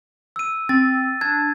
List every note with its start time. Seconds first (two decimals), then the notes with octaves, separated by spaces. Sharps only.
0.36 E6 D#7
0.69 C4 A6
1.21 D4 G#6